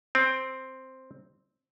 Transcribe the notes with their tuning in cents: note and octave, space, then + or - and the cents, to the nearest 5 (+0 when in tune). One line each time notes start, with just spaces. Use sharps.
C4 +0 G5 +20